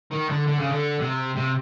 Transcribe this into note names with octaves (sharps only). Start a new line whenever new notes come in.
D#3
D3
D3
C#3
D3
C3
C3